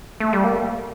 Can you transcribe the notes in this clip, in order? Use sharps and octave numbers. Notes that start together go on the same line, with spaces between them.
A3
G3
A#3